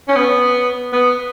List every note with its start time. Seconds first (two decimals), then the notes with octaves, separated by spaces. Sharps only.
0.08 C#4
0.16 B3
0.93 B3